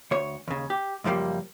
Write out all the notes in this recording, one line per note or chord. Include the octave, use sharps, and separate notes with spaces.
D2 C#5
D#2 C#3
G4
C#2 F#2 F3 G3 A#3